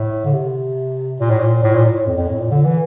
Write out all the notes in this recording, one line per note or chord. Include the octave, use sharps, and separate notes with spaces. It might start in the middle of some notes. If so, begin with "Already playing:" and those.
Already playing: A2
D3
C3
A#2
A2
A#2
A2
A#2
A2
F2
F2
A2
A#2
D3
E3